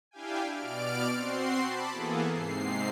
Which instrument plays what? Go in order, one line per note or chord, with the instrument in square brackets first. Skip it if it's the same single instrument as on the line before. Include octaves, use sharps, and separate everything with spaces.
[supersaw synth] D4 E4 G4 F5 G5 G#5
B2 D5 F6 D7
C4 F#4 C6 C7
A5 B5 D6
E3 A#3 B3 G#4 A4
G#2 C3 C7